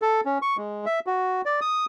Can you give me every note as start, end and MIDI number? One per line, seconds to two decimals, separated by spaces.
0.02 0.21 69
0.25 0.38 61
0.42 0.57 85
0.57 0.86 56
0.86 1.00 76
1.07 1.42 66
1.45 1.60 74
1.61 1.86 87